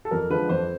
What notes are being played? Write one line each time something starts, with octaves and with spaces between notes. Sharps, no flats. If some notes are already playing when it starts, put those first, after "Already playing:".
A4
F2 A#4
D3 F3 G#3 B4
F2 C5